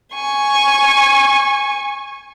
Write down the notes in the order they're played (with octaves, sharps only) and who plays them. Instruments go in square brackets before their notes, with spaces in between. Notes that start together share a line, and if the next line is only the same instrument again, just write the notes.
[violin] G#5 C#6